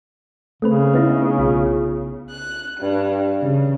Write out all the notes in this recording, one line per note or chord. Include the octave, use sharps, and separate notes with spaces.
C#3 A3 C4 B4
B3 D#4 E4
B1 F4
F#6
G2
C#3